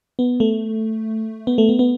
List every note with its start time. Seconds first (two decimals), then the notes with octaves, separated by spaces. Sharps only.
0.19 B3
0.40 A3
1.47 B3
1.58 A3
1.69 B3
1.79 B3